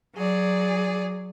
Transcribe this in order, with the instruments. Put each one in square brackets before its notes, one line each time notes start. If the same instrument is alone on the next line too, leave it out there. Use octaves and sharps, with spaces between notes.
[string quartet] F#3 G#4 D5